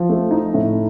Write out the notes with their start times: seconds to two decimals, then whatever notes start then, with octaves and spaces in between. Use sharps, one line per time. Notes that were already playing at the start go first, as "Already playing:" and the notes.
Already playing: F3
0.09 A3
0.31 D#4
0.54 A2